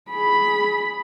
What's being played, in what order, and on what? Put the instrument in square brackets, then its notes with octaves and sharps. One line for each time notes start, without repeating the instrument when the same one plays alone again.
[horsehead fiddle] G#4 B5